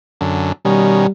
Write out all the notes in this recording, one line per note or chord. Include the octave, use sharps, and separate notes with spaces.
F#2 D3
B2 D#3 G3 C#4